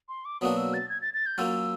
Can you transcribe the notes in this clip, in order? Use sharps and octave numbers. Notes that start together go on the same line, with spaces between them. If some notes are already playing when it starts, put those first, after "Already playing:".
C6
D6
B2 F#3 A#3 D4 F#4 D#6
E6
A6
G#6
A6
A6
G6
F#3 A#3 C#4 F4 E6